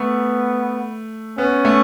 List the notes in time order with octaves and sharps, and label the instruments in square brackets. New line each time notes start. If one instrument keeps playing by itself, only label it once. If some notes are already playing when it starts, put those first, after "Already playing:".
Already playing: [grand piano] A3 [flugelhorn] B3
[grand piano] B3 [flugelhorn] C#4
[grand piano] A3